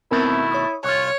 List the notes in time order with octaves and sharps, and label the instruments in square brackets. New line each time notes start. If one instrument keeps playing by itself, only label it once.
[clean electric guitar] B2 D#3 A3 [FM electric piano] B3 C4 A#4 [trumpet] E4
[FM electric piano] C#5 C#6 D#6
[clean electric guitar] C2 F4 [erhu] C#5 [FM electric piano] C#6 F#6